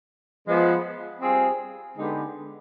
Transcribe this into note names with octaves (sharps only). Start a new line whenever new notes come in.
F3 G#3 B3
G3 C4 F4 G#4
D3 G#3 B3 D#4 G4